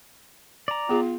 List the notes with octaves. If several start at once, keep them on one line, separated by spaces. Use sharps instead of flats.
D5 A#5
B3 F4 G#4